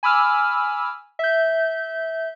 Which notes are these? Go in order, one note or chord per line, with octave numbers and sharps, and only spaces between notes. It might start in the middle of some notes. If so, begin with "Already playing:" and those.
G#5 B5 D6 E6 F6
E5 G6